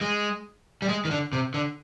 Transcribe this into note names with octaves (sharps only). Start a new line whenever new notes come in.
G#3
G3
G#3
D#3
D3
C3
D3